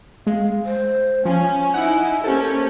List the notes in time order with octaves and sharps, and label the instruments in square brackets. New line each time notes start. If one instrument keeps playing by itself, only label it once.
[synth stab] G#3 [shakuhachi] F5
[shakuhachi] C5
[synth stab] F3 [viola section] C#4 [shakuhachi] G#5
[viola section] D#4 E4 [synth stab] F#5
[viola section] A#3 C#4 G4 [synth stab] A4 [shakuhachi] C5